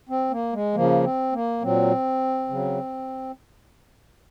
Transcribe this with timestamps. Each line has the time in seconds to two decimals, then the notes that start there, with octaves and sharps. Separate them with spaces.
0.09 C4
0.31 A#3
0.53 G#3
0.74 C#3 F3 A#3
1.04 C4
1.33 A#3
1.62 A#2 F#3 C4
2.49 C#3 F#3